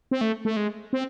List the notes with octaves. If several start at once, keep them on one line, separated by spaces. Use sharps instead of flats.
C4
A3
A3
G#3
C4